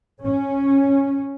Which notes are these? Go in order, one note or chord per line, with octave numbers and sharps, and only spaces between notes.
C#4